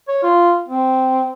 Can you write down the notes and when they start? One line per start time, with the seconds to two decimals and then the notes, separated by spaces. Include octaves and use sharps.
0.08 C#5
0.23 F4
0.69 C4